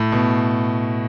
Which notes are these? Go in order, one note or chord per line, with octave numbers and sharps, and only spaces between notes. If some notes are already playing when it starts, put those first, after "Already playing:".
Already playing: A2
B2